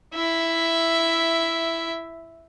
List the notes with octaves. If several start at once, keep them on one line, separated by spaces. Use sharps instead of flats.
E4 E5